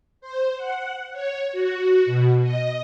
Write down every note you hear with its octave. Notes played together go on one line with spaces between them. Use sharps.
C5
F#5
C#5
F#4
B2
D#5